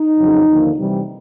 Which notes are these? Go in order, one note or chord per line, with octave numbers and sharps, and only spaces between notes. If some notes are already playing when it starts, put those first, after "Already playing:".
Already playing: D#4
F2 C#3 F#3
D#2 D3 F3 A#3
C3 E3 G3